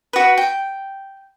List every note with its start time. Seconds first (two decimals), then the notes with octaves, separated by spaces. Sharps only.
0.13 F#4 B4
0.38 G5